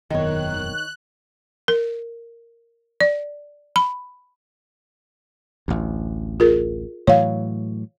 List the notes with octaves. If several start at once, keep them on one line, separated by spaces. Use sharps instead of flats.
E1 F#2 D#3 B3 D#4 C#5 F#6
A#4
D5
B5
A1 D2
F4 G#4 A#4
A2 E3 F#3 C#5 F5